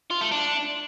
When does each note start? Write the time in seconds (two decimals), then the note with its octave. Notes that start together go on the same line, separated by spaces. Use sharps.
0.10 F4
0.21 A3
0.32 D4